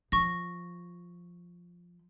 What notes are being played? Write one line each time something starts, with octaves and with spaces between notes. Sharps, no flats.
F3 C#6 A#6